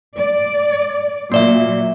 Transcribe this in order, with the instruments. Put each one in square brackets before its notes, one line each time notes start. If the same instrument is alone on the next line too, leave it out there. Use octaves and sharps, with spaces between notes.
[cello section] D5
[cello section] A#2 F#3 [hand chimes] A#3 D5 E5